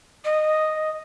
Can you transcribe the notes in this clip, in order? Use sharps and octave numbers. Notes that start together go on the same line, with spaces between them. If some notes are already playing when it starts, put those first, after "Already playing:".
D#5